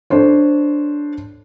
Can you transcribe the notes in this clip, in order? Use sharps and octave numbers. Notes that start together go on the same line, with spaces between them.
D4 A4 C5 C#5